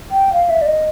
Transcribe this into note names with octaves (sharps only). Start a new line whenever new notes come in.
G5
F5
E5
D5
D#5